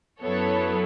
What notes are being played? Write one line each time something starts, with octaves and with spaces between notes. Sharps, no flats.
F#2 F#3 B3 E4 A4 C#5